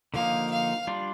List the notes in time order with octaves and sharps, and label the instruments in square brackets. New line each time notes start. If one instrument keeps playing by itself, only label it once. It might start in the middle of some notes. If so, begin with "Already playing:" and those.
[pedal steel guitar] D3 F3 A#3 D#4 [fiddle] F5
[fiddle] F5
[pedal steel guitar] G3 D4 F4